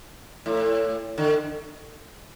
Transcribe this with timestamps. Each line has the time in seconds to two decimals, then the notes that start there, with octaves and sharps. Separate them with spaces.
0.46 A2
1.18 D3